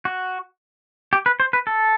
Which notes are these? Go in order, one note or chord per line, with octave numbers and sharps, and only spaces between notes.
F#4
G4
B4
C5
B4
A4